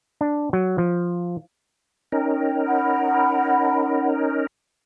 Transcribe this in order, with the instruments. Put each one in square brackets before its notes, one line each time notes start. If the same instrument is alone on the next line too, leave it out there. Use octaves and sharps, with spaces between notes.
[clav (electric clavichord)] D4
F#3
F3
[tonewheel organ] C#4 D#4 A#4 [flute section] G5
[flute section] F#5 B5